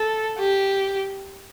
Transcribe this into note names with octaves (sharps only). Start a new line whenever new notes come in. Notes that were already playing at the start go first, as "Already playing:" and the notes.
Already playing: A4
G4